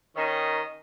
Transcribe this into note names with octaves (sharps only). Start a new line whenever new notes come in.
D#3 C#4 D#5